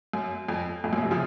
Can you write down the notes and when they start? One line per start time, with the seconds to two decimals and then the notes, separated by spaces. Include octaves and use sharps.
0.13 F#2
0.49 F2
0.84 F2 A2
0.93 F#2 A#2
1.02 A2 C3
1.11 C#3 F3